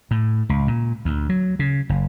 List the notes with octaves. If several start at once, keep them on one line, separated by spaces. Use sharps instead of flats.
A2
C#2
A#2
D2
F#3
C#3
F#1